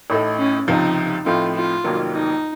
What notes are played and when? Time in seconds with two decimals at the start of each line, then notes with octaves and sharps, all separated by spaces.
0.10 A1 A2 A3 D#4 A4
0.38 C#4
0.68 C#2 C3 F3 D#4
1.26 A2 F3 A3 C4 D#4 F4
1.56 F4
1.84 F1 F2 D#3 F#3 A#3
2.14 D#4